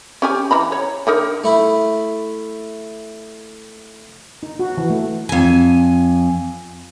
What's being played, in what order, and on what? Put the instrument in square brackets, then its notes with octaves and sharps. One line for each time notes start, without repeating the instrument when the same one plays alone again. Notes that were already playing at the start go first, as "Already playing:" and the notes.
[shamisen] C#4 G4 G#4
E3 A#5 B5
C#5
D3 D#4 A#4
[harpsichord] A3 E4 B5
[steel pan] D#4
F#4
E3
A3
[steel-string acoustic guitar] F2 G#5